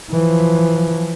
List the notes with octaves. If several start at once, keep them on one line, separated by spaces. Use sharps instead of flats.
E3 F3